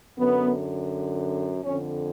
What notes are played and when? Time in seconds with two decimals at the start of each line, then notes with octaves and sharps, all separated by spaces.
0.18 F#2 D3 B3
1.64 F2 D3 C#4